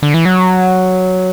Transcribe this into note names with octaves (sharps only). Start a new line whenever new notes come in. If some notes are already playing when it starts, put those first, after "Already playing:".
D3
E3
F#3